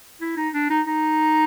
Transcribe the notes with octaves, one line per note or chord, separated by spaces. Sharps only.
E4
D#4
D4
D#4
D#4